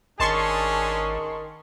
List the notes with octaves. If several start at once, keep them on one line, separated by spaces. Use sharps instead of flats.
G#1 D#3 C#4 D4 G#4 A5 C6 C#6